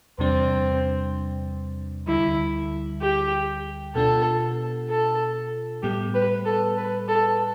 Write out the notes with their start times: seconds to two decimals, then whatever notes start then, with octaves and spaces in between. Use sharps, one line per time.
0.19 E2 C3 G3 C4 D4
2.07 D2 D3 G3 E4
3.02 G4
3.95 B2 B3 D4 F4 A4
4.90 A4
5.83 A2 G3 B3 G4
6.14 B4
6.45 A4
6.78 B4
7.08 A4